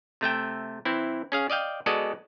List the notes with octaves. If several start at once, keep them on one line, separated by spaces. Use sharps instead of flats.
C3 A3 E5 G5
E3 C4 E4
C#4 G#4 F5
D5 D#5 F5 G5
G#3 B3 F#4 A4 D5 D#5